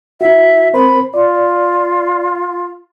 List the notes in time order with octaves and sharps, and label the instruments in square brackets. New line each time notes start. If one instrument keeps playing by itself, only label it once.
[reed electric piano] E4 F#4 [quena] E5
[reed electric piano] C4 A#4 C5 [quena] B5
[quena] F4 [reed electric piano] D5